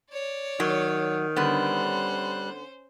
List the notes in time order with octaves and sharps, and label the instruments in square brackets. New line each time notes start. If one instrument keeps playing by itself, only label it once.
[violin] C#5 D5
[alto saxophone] D#3 [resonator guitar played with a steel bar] F#3
[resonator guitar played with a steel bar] D3 B3 [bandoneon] G3 F#6 [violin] C#4 C5